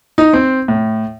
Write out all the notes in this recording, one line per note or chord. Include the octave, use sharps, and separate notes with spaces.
D#4
C4
A2